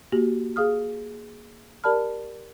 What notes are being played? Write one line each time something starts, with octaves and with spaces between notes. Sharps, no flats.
A#3 F#4 G4
G#4 F5 D#6 F6
G4 A#4 D5 A5 B5 F6